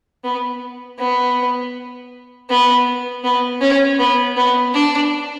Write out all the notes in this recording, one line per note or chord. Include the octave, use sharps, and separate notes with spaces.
B3
B3
B3
B3
C#4
B3
B3
D4